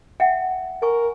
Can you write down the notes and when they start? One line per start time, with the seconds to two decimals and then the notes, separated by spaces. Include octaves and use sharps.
0.20 E5 F#5 G5
0.82 A#4 G#5 C#6